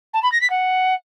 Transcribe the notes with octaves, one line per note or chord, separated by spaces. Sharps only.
A5
B5
A#6
B6
F#5